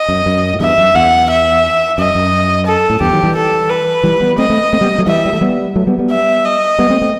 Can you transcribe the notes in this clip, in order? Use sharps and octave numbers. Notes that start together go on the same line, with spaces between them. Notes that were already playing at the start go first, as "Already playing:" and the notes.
Already playing: D#5
F#2
F#2
A2
E2 G2 E5
F#2
E2 F#5
E5
F#2 D#5
F#2
A4
A2
E2 G2 G4
D#3 F#3
E3 G3
A4
B4
E3 G3
G3 B3
A3 C4 D#5
A3 C4
A3 C4
G3 B3
F#3 A3
E3 G3 E5
G3
A3
G3 B3
F#3 A3
G3 B3
G3 B3
E5
D#5
G3 B3
A3 C4
A3 C4